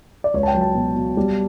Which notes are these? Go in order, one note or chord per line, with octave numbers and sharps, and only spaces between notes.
D5
C#2 C#5
A5
G5
F#3
A5
B2
B2
G3